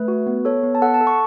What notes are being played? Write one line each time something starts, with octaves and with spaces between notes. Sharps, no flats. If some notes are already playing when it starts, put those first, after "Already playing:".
Already playing: A3 B4
F#4
B3
A4 C#5
B3
A5
A4 F#5
A5
A4
C#6